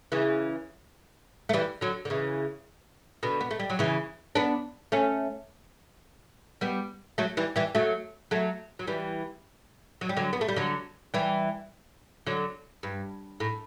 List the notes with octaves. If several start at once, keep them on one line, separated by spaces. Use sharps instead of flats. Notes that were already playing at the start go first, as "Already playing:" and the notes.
C#3 E3
A3
E3 G3
D3 F#3
D3
C#3 E3
B2 D3
B3
A3
G3
F#3
C#3 E3
B3 D4
A3 C#4
G3 B3
F#3 A3
E3 G3
E3 G3
F#3 A3
F#3 A3
F#3
E3 G3
F#3
G3
D3 F#3
B3
A3
G3
D3 F#3
E3 G3
D3 F#3
G2
A2